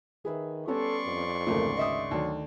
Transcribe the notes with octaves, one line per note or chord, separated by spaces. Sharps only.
D#3 G#4 B4 E5
G3 B3 C#4 A4 D5 C6 C#6
F2
G#1 D2 C#3 A3 A#3
D#5 E5 D#6
D2 D#3 F#3